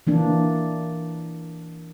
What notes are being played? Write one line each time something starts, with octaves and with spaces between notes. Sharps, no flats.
E3 A#3 D4